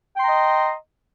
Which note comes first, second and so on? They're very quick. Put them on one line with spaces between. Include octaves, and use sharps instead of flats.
G5 C6 A#5 D#5